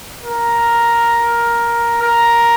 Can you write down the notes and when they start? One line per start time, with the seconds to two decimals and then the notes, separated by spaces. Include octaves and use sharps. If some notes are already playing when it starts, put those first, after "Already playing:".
0.23 A#4
2.02 A#4